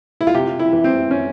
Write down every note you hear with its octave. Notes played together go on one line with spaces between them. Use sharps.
E4
F4
C3 G4
E4
E3
C4
C#4